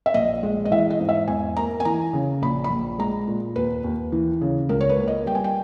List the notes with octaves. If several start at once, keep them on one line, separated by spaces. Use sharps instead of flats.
E5
A#1 D#5
G#3
D#5
E3 E5
D#5
G#2
E5
E2 G#5
A#3 A#5
G#5
E3 A#5
C#3
A#1 B5
B5
A#1
G#3 A#5
A#2
D#2 B4
D#2
E3
C#3
C#2 A#4
C#5
B4
A#3
D#5
G3 G5
G#5
G5